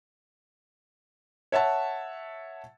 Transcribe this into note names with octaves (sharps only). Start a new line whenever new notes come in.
C#5 E5 F#5 A5